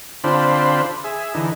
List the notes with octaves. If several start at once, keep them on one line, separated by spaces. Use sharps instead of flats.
D3 C4 D4 F4 C5 B5
G#4 E5
D3 E3 D#4